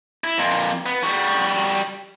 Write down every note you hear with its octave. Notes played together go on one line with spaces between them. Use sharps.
E4
F2 A#2
B3
G3 F#4